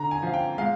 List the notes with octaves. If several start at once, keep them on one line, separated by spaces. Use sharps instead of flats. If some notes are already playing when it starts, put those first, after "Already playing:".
Already playing: D3 A#5
G#5
F3 F5
G5
G#3 F5